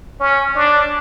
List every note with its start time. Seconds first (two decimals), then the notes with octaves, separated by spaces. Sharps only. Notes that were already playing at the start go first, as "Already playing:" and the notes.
0.20 C#4
0.55 D4